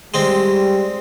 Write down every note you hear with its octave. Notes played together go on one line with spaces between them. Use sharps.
G3 G#3 C4